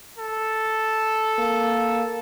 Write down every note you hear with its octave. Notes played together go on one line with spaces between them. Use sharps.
A4
A#3